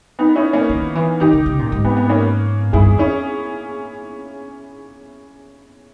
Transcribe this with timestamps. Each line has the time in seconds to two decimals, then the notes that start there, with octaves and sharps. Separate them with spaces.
0.19 B3 D#4
0.35 C#4 E4
0.53 A#3 C#4
0.69 D#3
0.95 E3
1.20 D#3 D#4 G4
1.33 C#3
1.46 C#3
1.59 A#2
1.72 G#2
1.85 B3
1.97 B3
2.09 A#3 C#4
2.73 G2 E4 G#4
2.91 E2
2.98 C#4 E4